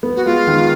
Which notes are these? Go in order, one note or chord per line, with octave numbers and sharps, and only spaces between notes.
B3
F#4
G#3 F4
D#3